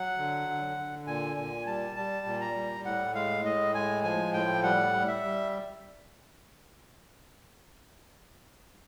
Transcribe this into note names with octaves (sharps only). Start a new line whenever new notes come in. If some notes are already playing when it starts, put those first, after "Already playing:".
Already playing: F#3 F#5
D3
D3
D3
A#2 G#5
A#2 G#5
G3 A5
G3 A5
A#2
A#5
G3
A2 F#5
G#3 F5
A2 D#5
G#3 G#5
F3 G#5
A2 G5
G3 F#5
G3
E5
G3